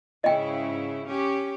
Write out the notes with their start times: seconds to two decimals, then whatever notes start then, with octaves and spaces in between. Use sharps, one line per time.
0.24 G#2 C#3 E4 D#5 G5
1.07 C#4 G4